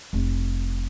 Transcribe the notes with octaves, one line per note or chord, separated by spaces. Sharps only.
F1